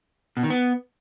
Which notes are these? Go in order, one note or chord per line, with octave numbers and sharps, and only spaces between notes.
B2
D#3
B3